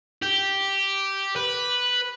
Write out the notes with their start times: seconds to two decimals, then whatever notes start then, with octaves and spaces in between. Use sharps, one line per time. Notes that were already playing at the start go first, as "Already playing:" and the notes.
0.22 G4
1.36 B4